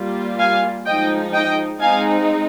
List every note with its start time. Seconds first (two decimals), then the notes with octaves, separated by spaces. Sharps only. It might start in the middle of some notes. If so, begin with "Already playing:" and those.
Already playing: G3 A#3 F4
0.39 F5 G#5
0.86 F3 G#3 D#4 D#5 G5
1.34 D#5 G5
1.80 G#3 C4 D#4 F5 G#5